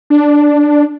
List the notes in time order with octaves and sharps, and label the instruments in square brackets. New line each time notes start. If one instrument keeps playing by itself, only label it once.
[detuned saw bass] D4